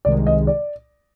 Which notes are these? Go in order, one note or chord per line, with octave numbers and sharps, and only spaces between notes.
C2 C3 D#3 G#3 D5
D#5
D5